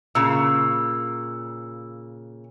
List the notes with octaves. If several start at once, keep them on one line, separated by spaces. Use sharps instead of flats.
A#2 C#3 E6